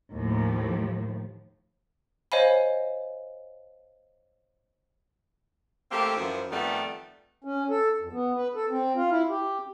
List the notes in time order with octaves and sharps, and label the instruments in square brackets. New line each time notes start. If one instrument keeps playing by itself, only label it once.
[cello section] D#2 A2 F3
[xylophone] C5 C#5 D#5 F5 G#5 B5
[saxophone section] A3 A#3 C4 G4
F#2 E3 F3
F2 D#3 G3 A3 B3
[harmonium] C#4
A4
F2
B3
B4
A4
C4
F4
E4
G4